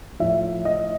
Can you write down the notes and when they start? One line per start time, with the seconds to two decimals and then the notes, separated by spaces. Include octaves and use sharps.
0.19 A2 F3 E5
0.65 D#5